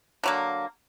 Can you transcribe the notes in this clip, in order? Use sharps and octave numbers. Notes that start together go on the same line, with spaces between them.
D3 F#3 A#3